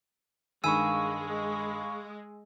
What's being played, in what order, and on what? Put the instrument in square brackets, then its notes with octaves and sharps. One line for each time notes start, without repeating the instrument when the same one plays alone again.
[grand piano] G2 D#3 [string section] G#3 [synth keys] F5 B5 C#6 [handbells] G#5 E6